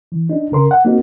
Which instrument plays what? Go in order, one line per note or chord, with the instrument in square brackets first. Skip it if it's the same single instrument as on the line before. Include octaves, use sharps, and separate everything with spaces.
[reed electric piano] E3
D4 D#4
C#3 A#4 C6
F#5
A#3 C4 D#4 F#4